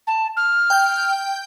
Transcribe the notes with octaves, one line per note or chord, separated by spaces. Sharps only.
A5
F6
G5 G6